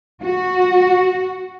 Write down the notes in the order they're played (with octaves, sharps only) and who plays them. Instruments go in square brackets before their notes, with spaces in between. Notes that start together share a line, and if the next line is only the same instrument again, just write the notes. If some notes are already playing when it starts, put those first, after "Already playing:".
[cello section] F#4